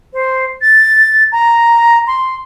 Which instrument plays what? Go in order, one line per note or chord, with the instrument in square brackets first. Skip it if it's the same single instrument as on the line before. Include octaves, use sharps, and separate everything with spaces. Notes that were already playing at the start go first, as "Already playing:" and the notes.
[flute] C5
A6
A#5
C6